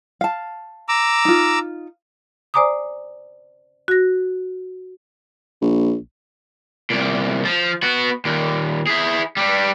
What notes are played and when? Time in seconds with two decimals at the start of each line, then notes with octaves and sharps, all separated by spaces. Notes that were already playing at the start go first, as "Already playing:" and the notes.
0.21 F5 A5
0.88 A#5 D6 E6
1.25 D#4 F4
2.54 C5 D5 G#5 A#5 D6 D#6
3.88 F#4 A#6
5.61 A#1
6.90 C2 A#2
7.45 F3
7.83 B3 F#4
8.25 D#2 A#2
8.87 E4 G#4
9.37 G3 D4